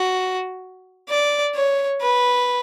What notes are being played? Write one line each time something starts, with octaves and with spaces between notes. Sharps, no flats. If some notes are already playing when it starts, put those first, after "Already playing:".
Already playing: F#4
D5
C#5
B4